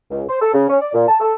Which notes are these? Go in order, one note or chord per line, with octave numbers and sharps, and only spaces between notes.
C#2
C5
A4
C#3
C#4
D5
A#2
A5
A4